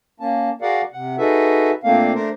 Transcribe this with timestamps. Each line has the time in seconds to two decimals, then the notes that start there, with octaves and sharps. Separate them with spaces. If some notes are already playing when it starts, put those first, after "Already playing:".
0.20 A#3 C#4 A5
0.62 F#4 G#4 A#4 D5 F5 F#5
0.93 C3 F#5
1.18 D#4 F#4 G#4 A4 B4 E5
1.84 A#2 A3 A#3 C4 D4 F5
2.14 A3 D4 A#4 C5